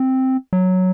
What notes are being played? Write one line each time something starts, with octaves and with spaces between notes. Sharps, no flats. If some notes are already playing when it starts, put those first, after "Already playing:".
Already playing: C4
F#3